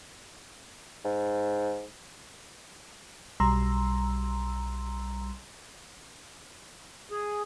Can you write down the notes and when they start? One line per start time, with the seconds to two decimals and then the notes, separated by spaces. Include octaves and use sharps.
1.05 G#2
3.40 B1 G3 A#5 C6 E6
7.11 G#4